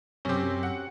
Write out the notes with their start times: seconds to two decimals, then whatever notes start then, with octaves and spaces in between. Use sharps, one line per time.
0.25 F#2 C3 C4 C#4 G4
0.63 F#5